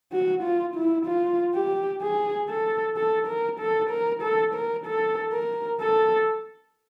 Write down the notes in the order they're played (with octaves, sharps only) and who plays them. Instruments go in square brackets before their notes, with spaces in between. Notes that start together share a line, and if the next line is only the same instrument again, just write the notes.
[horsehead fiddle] F#4
F4
E4
F4
G4
G#4
A4
A4
A#4
A4
A#4
A4
A#4
A4
A#4
A4